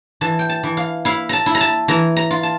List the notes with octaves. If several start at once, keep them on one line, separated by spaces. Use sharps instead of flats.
E3 A5
G5
A5
E3
F5
E4 F5
A5 A#5
E4
A#5
A5
E3 A#5
A#5
F4
A5